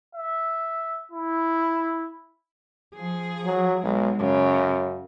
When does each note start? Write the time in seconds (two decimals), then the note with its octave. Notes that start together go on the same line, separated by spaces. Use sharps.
0.15 E5
1.12 E4
2.95 F3 G#4
3.45 F#3
3.83 B1 G#3
4.19 F#2 C#3